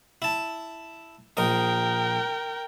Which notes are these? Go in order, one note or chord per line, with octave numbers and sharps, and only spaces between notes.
E4 A5
A#1 A#4 D#5 G5